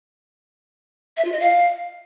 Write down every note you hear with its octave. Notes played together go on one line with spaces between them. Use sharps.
E5
F4
D#5
F5